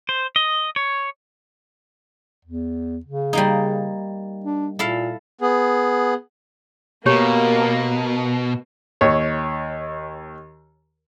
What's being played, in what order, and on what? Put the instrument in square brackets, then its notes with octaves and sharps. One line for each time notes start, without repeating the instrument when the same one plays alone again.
[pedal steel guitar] C5
D#5
C#5
[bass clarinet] E2
C#3
[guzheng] G3 A#3 D#4
[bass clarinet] D4
[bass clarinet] A#2 [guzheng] E4 A4 F5
[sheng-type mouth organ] B3 G#4
[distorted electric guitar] B2 [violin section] A#3 [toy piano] G4 C#5
[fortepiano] D#2 C#5